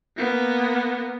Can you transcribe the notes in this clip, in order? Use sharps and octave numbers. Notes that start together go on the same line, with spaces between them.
A#3 B3